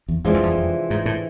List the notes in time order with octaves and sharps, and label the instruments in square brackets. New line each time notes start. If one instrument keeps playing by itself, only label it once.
[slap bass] E2
[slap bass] F2 [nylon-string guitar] C3 E3 G#3 D4 F4
[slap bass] E2
F2
F2
G#2
A2